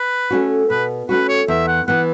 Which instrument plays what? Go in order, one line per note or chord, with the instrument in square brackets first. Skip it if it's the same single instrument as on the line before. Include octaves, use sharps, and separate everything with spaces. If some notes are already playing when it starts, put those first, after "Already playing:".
Already playing: [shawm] B4
[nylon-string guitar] A3 C#4 F#4
[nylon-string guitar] B2 [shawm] B4
[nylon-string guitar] A3 C#4 F#4 [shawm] B4
[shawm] C#5
[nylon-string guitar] E2 [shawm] E5
[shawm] F#5
[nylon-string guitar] E3 B3 [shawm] F#5